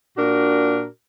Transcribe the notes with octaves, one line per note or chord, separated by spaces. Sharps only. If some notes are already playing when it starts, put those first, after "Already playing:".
A#2 D4 F#4 A#4